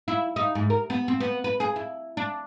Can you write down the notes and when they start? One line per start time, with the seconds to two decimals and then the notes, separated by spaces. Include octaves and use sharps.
0.08 E4
0.36 D#4
0.55 G#2
0.70 A#4
0.90 B3
1.08 C4
1.20 B3
1.44 B4
1.60 G#4
1.76 E4
2.17 D4